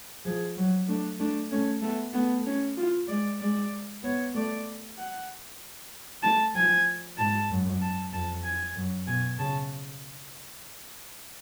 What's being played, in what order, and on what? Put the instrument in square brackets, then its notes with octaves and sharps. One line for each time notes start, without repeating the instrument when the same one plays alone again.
[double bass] F3 [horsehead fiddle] G#4
[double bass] F#3
[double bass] A3 [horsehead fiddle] D4
[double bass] A3 [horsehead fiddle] D4
[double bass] A3 [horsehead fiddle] C#4
[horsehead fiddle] A3 [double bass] B3
[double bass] A3 [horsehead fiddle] B3
[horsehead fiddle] C#4
F4
[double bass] G#3 [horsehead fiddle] D5
[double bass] G#3 [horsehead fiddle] D5
[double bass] B3 [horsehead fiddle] C#5
[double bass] A3 [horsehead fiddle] D5
[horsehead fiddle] F#5
[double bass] A3 [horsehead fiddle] A5
[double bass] F3 [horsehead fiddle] G#5
[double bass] G#2 [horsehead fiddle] A5
[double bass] F#2
[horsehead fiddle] A5
[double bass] F2 [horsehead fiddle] A5
[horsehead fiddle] G#5
[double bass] F#2
[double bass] B2 [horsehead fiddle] G#5
[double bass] C#3 [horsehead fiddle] A5